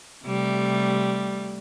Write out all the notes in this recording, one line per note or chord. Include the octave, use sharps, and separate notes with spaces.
C3 G3 A3